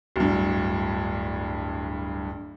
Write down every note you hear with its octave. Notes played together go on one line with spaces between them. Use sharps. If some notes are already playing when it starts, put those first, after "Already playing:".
D1 G2